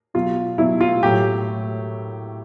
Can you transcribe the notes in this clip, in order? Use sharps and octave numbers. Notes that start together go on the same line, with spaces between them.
B2 F#3 F4
B2 F#3 E4
F4
A2 F#3 G4